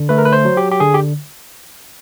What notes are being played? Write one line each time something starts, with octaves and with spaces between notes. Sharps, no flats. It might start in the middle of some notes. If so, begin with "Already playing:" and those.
Already playing: D3
A3 B4
A#4
B4
C5
F#3
G4
G4
D3 G#4
G4